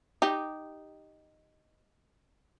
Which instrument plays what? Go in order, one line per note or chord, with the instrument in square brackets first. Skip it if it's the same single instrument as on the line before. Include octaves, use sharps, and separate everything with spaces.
[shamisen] D#4 G4